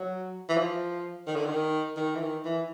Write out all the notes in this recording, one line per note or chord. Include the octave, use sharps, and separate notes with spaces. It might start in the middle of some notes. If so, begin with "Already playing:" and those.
Already playing: F#3
E3
F3
D#3
D3
D#3
D#3
E3
D#3
E3